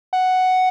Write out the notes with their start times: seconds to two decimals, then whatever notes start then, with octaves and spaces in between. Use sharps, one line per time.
0.13 F#5